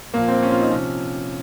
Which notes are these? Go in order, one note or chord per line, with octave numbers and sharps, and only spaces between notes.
A#2 F3 A#3
C4
C#4
F4
D#4
C3 F3 C#4